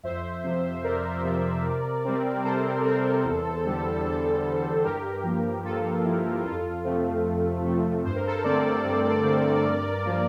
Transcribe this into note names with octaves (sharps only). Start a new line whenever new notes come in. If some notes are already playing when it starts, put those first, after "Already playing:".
F2 C5 E5
C3 F3
F2 A#4 D5
C3 F3
C3
G3 C4
C3 A4 C5
G3 C4
E2
D3 G3
E2
D3 G3
G2 G4 A#4
F3 A#3
G2 F4 A4
F3 A#3 E4 G4
F2 F4 A4
C3 F3 A3 C4
F2
C3 F3 A3 C4
G2 C5
A#4
A4 C5
D3 A3 C4 A#4 D5
G2
D3 A3 C4
G2
F3 A#3